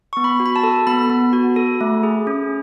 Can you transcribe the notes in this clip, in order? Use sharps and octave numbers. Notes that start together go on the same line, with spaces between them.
B3 C#6
B5
F#4
B5
A5
A4
B3 B5
B3
F#4
A4
A3
G#4
C#4